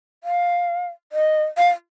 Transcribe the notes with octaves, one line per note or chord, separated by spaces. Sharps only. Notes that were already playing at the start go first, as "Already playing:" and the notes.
F5
D#5
F5